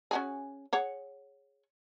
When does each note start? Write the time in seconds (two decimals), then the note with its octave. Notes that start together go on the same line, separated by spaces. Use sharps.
0.11 C#4 F#4 G#4
0.73 G#4 C#5 F#5